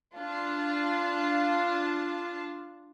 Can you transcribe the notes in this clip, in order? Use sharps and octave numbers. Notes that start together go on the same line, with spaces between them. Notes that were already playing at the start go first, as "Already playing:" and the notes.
D4 F4 A5